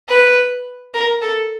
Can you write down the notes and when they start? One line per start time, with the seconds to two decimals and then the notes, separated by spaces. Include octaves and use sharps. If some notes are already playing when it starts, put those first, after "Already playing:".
0.08 B4
0.94 A#4
1.22 A4